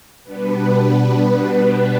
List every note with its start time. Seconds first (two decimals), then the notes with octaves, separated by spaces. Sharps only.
0.24 B2 G3 B3 D4 B4